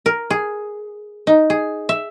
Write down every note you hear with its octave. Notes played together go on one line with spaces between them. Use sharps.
A#4
G#4
D#4
G#4
E5